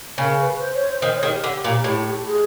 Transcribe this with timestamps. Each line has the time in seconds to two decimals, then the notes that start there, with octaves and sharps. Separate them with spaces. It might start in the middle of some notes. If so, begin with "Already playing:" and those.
0.18 C#3 A#4
0.39 B4
0.59 C5
0.75 C#5
0.87 C5
1.02 D#3 C5
1.15 C#5
1.23 D#3 G#4
1.29 G4
1.44 D3
1.64 A#2
1.84 A2
2.26 G#4